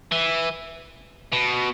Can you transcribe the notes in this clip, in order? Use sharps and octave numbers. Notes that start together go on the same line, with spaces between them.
E3
B2